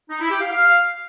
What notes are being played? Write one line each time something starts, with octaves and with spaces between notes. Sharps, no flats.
D#4
E4
G4
F5
F5